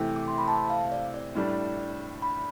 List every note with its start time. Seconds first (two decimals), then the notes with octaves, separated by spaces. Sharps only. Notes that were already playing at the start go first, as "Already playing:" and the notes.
Already playing: C3 E3 A3 G5
0.16 D6
0.28 C6
0.38 B5
0.48 A5
0.70 F5
0.92 D5
1.14 D5
1.35 A2 G3 D4
2.22 B5